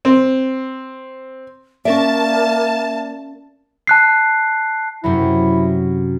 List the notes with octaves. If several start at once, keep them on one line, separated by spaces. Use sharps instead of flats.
C4
A#3 C#4 A#4 D5 E5 A5
A5 F#6 C7
F#2 C3 F#3 E4